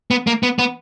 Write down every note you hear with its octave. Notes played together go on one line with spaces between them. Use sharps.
B3
A#3
B3
B3